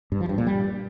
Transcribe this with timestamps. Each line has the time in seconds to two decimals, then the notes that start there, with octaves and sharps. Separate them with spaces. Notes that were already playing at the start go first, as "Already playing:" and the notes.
0.12 G2
0.20 F3
0.29 G2
0.38 A#2
0.47 G3